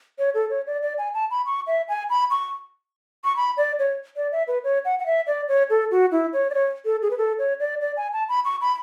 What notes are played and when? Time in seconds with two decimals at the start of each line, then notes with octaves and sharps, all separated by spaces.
0.19 C#5
0.35 A4
0.50 C#5
0.67 D5
0.82 D5
0.98 G#5
1.14 A5
1.31 B5
1.46 C#6
1.67 E5
1.89 G#5
2.10 B5
2.30 C#6
3.24 C#6
3.36 B5
3.57 D5
3.79 C#5
4.16 D5
4.32 E5
4.47 B4
4.64 C#5
4.85 F#5
4.99 F#5
5.06 E5
5.27 D5
5.48 C#5
5.70 A4
5.91 F#4
6.12 E4
6.33 C#5
6.50 D5
6.54 C#5
6.85 A4
7.02 G#4
7.11 B4
7.18 A4
7.39 C#5
7.60 D5
7.81 D5
7.97 G#5
8.13 A5
8.29 B5
8.45 C#6
8.61 B5